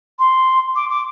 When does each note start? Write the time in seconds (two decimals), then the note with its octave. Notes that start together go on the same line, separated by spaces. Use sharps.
0.19 C6
0.76 D6
0.90 D6